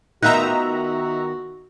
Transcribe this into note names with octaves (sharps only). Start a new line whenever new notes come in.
D#3 B3 D#4 F4 F#4 E5 A#5 F#6